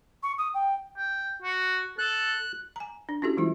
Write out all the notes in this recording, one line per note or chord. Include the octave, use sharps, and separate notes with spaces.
C#6
D#6
G5
G5
F#4
A4 F#6
G#5 A#5
D4
C#4 E4 F#4 G4 A4
E3 G3 G#3 E4 F4